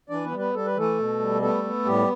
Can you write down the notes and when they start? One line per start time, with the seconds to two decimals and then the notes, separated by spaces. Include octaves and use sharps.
0.10 E3 D4 D5
0.25 B3 B4
0.32 G3
0.39 B3 B4
0.54 G3 A4
0.66 B4
0.76 E3 A3 A4
0.98 B2
1.19 G3
1.42 A3 B3 A4
1.64 B3
1.85 A2 G3 G4